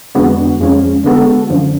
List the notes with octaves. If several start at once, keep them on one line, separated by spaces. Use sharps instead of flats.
F2 D3 G#3 B3 F#4
F2 F3 G#3 C#4
D3 G#3 B3 F#4 A4
F#2 D3 F3